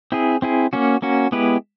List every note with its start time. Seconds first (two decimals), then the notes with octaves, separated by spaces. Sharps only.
0.12 C4 E4 G#4
0.42 C4 E4 G#4
0.73 A#3 C#4 F#4
1.02 A#3 C#4 F#4
1.32 G#3 B3 E4 G4 B4